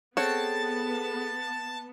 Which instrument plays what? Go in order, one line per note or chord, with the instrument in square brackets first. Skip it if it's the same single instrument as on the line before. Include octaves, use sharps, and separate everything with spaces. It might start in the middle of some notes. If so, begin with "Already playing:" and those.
[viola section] B3 [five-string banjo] C4 C#5 F#5 [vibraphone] G#4 A4 [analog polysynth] A5